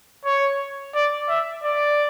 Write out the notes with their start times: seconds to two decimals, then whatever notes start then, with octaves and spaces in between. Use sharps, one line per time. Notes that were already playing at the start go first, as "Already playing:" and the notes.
0.25 C#5
0.95 D5
1.28 E5
1.63 D5